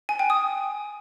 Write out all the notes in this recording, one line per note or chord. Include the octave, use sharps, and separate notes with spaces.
G#5
G5
D#6